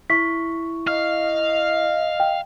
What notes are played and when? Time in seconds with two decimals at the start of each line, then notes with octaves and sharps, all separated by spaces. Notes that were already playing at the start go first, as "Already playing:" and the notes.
0.10 E4 E5 C#6 B6
0.87 D#5 F5 F6
2.20 G5